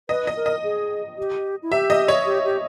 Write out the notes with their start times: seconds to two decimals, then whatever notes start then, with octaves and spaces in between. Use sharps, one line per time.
0.09 B4 D#5
0.27 D#5
0.36 A#4
0.46 D#5
0.64 G#4
1.18 G4
1.62 E4
1.72 G4 E5
1.90 D#5
2.08 C#5
2.26 G4
2.45 G4